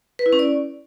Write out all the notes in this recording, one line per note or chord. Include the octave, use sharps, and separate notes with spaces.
B4
E4
C#4
D5